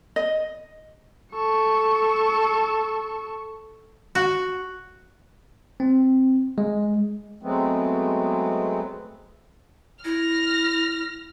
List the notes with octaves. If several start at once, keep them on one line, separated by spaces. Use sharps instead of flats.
D#5
A4 C#6
F#4
C4
G#3
F#3 G#3 A3 B3 C4
E4 F6 A#6